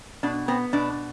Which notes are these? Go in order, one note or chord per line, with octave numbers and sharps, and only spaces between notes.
B2 D4
B3 C4
B2 D4